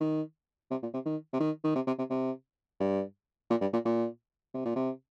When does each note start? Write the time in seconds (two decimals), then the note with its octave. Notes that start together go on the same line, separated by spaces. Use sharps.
0.01 D#3
0.71 C3
0.83 A#2
0.94 C3
1.06 D#3
1.33 C3
1.40 D#3
1.64 D#3
1.75 C3
1.87 C3
1.98 C3
2.10 C3
2.80 G2
3.50 A#2
3.61 G2
3.73 A#2
3.85 A#2
4.54 C3
4.65 A#2
4.76 C3